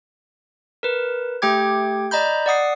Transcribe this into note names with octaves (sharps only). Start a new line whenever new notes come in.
A#4 B4
A3 G4 G5 D6 G#6
D5 D#5 A#5 B5 G6
D5 F#5 D#6 C7